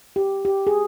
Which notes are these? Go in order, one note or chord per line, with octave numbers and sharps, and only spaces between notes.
G4
G4
G#4